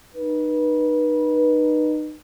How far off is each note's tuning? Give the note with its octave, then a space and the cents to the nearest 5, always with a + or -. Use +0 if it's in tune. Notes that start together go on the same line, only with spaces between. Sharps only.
D#4 -30 B4 -25